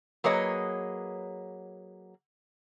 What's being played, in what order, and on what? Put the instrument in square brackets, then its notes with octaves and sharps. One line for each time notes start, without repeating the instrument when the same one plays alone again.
[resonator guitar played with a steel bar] F#3 A#3 G#4 B4 C#5 D#5